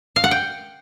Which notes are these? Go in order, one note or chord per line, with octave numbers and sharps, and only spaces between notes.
F5
F#5
G5